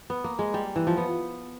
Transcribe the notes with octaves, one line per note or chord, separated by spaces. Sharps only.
B3
A#3
G#3
G3
E3
F3
B3